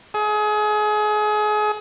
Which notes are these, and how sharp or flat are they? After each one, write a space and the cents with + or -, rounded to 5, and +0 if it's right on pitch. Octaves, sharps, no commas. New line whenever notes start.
G#4 +30